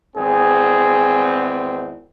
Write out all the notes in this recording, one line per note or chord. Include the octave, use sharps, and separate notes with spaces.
G#1 E2 C4 G#4